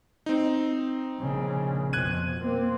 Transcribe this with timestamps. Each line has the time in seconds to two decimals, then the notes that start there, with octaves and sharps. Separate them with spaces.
0.26 C4 D#4
1.20 A#1 C#3
1.93 F2 B2 F#6 G#6 D#7
2.40 A#3 C4